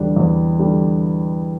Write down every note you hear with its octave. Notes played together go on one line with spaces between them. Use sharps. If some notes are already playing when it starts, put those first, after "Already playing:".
Already playing: E2 D3 G3 D4
E2
D3 G3 D4